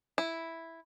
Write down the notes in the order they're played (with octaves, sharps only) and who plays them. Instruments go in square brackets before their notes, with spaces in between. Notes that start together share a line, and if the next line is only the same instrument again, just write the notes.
[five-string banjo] E4